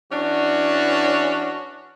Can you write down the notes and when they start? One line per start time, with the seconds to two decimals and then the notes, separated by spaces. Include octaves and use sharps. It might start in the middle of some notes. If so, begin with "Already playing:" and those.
0.12 E3 C#4 D4 F#4